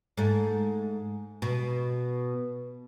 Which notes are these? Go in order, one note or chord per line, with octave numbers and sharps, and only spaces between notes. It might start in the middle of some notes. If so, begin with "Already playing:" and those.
G#2 A3
B2